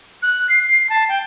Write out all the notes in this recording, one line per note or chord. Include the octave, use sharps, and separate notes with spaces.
F#6
C7
A5
G5